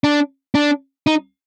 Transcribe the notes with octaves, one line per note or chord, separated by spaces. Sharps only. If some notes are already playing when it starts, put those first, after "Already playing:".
D4
D4
D#4